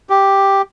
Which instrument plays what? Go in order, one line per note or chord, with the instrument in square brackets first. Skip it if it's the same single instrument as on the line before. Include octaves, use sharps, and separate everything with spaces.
[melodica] G4